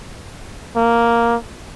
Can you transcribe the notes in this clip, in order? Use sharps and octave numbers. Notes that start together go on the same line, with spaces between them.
A#3